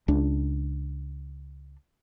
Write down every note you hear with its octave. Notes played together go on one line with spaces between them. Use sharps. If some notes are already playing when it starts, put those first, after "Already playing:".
C#2 D4